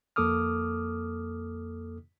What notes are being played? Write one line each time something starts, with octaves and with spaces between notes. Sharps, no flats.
F2 A#3 A4 D6 D#6 F6